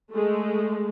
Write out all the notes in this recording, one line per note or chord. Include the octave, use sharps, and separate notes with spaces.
G#3 A3